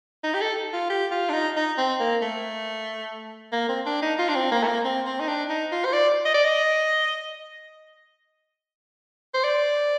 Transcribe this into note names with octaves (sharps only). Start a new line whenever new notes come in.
D#4
G4
A4
F4
G4
F4
D4
D#4
D#4
C4
A#3
A3
A#3
C4
D4
D#4
F4
D4
C4
A#3
A3
A#3
C4
C4
D#4
D4
D#4
F4
C5
D5
D#5
D5
D#5
C5
D5